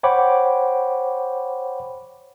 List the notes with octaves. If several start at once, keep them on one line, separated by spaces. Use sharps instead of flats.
C5 C#5 F#5 G5 B5 D6